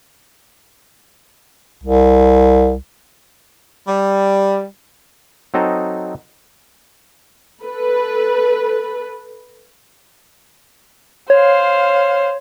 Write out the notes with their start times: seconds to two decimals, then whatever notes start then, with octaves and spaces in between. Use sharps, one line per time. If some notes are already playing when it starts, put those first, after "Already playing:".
1.84 C2
3.88 G3
5.54 F#3 C4 D#4 A4 D#5
7.61 A4 B4
11.30 C5 C#5 F5